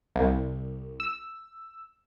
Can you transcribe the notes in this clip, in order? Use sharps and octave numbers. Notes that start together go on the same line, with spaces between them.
C2
E6